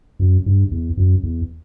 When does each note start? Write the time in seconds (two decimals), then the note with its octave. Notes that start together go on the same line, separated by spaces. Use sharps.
0.19 F#2
0.46 G2
0.71 E2
0.97 F#2
1.23 E2